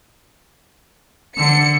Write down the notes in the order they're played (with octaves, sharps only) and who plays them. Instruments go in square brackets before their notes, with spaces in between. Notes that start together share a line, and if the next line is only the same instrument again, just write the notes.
[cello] D3 [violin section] C#7